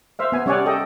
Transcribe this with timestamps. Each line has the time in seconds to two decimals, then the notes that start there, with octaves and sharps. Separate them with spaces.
0.19 C5 E5 F5
0.32 B3 G#5
0.46 G3 C#4 C#5 D5 F#5 G#5
0.66 G4 A4 D#5 G5